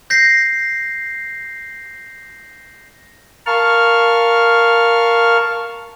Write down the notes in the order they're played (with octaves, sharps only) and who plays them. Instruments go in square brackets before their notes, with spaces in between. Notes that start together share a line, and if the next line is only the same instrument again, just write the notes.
[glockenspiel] G6 A#6 C7
[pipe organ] A#4 F5 A5 C#6 F6